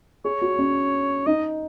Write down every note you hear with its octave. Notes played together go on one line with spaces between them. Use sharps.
G#4 C#5
F#4
C#4
D#4 D#5